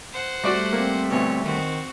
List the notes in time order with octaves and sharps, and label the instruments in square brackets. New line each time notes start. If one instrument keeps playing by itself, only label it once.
[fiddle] C5 F#5
[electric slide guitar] G3 A3 [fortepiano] F#4 D5 C#6
[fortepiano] A#3 [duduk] C4
[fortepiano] D2 B2 [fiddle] C#5
[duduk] D#3 [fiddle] C4 F#4